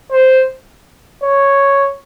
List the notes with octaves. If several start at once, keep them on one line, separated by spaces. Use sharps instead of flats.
C5
C#5